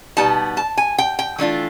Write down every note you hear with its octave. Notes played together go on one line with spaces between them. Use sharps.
B2 G3 B3 D#4 A5
A5
G#5
G5
G5
E3 A3 D4 F4